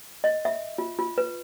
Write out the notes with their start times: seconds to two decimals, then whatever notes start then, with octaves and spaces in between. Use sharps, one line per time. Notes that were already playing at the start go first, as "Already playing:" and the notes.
0.24 D#5
0.45 E5
0.78 F4
0.99 F4
1.18 B4